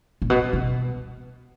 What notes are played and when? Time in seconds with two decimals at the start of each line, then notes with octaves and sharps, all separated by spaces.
0.22 A#2
0.30 B2
0.53 B2